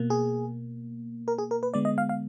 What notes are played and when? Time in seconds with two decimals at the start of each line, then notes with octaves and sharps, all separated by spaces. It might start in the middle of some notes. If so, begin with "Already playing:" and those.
Already playing: B2 A#3
0.10 G#4
1.28 A#4
1.38 G#4
1.51 A#4
1.63 B4
1.74 D3 G#3 B3 D5
1.85 D#5
1.98 F5
2.09 F5